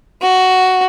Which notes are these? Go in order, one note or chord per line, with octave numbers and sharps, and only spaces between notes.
F#4